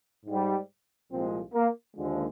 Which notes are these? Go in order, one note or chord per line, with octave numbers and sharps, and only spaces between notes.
G#2 G3
C2 A#2 F3 G#3 C4
A#3
D#2 D3 F3 G#3